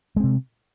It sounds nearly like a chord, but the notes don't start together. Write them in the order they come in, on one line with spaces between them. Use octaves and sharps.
G#3 C4 C3